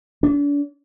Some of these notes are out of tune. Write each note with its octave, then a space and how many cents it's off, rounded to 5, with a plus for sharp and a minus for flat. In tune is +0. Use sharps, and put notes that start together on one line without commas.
D4 -40